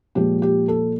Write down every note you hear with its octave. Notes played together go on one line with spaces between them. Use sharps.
A#2 F3 G#3 G4
G4
A4